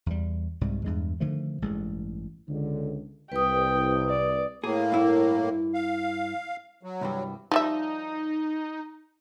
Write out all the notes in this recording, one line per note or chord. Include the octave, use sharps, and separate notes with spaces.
E2 G3
C2 G#2 C3 G3
E2 G2 G#3
D3 D#3 F3 A3
A1 G2 G#3
C#2 D3
C2 B4 G5 D#6
D5
A2 A#3 G#4
G2 E4
F5
F#3
C2 G2 G3
F3 G3 D#4 E5